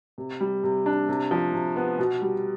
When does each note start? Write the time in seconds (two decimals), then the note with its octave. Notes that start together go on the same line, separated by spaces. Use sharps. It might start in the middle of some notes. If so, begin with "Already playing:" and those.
0.18 C3
0.40 G3
0.64 C3
0.86 D4
1.09 C3
1.31 F3
1.54 C3
1.76 B3
1.99 B2
2.22 G3